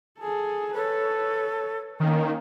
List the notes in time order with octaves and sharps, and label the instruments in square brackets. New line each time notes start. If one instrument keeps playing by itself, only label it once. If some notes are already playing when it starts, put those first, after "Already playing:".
[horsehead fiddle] G#4 A4
[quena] A4 [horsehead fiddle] B4 C#5
[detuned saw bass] D#3 [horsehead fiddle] A#3 C#4